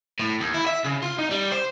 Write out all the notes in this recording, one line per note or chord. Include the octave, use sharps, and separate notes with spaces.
A2
D#2
E4
E5
C#3
F4
D#4
G3
C5